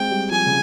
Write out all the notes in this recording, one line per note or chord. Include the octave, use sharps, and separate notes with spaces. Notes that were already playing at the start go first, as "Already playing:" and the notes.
Already playing: G#3 C4 G5
G3
F3 G#5
C#3